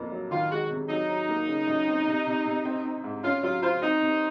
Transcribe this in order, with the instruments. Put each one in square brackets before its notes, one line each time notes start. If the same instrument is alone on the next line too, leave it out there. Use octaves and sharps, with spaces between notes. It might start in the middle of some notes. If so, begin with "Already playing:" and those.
Already playing: [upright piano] F2 A#3
F#3
[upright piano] D#3 [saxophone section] F4
[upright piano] G#3 [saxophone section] F#4
[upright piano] C3
[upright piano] F#3 [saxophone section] D#4
[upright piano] F#3
A#3
C#3
F#2
C4
C3
C3
C3
C4
C4
G#2
[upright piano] C#4 [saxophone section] F4
[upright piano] F#3 [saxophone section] F4
[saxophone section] F4 [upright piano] C5
[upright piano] C4 [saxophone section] D#4
[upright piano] C3